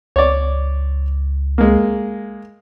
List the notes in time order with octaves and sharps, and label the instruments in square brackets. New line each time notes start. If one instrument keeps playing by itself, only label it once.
[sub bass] C#2 [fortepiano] C#5 D5
[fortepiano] G#3 A#3